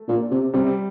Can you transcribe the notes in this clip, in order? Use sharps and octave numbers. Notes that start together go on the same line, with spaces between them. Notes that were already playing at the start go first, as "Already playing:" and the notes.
Already playing: A3
A#2
C3
C3 G3